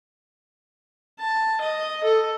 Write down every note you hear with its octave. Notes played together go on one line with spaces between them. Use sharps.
A5
D#5
A4